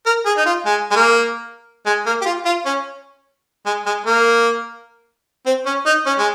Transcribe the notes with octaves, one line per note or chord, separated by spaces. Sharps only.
A#4
G#4
D#4
F4
G#3
G#3
A#3
G#3
A#3
G4
F4
F4
C#4
G#3
G#3
A#3
C4
C#4
D#4
C#4
G#3